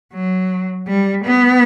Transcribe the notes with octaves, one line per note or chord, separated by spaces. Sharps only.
F#3
G3
B3